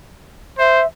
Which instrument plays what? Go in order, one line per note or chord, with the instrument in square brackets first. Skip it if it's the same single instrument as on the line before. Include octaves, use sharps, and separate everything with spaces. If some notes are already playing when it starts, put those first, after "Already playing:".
[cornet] C5 [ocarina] E5